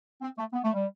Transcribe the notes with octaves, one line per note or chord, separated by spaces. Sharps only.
C4
A3
B3
A3
G3